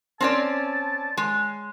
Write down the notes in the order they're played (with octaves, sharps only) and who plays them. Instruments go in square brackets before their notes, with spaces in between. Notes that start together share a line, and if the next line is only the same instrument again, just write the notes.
[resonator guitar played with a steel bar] C4 C#4 D5 [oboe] A5
[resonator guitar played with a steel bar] G#3